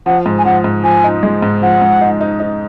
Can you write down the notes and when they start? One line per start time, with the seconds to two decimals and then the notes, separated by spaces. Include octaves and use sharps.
0.06 F3 F#5
0.26 G#2
0.38 G#5
0.45 F3 F#5
0.64 G#2
0.83 F3 G#5
1.04 D#4
1.23 G#3
1.42 G#2
1.62 F3 F#5
1.82 G#2
2.01 D#4
2.21 D#4
2.40 D#4